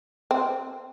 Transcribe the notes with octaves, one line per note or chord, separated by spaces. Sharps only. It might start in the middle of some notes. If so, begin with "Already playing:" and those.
C4